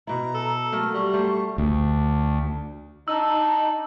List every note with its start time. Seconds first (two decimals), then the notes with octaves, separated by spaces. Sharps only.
0.07 B2 E4 A#5
0.34 A4
0.72 F#3 A3 A#3 F6
0.93 G3 C#6
1.14 A3 C5
1.58 D2
3.08 D4 D#4 E6